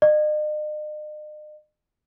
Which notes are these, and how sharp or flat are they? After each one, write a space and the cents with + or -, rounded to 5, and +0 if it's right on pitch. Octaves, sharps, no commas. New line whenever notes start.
D#5 -45